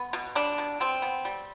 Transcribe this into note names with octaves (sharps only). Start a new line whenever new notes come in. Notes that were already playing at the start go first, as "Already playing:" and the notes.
Already playing: B3
B2
G3 D4
B2
B2 C4
B3
G3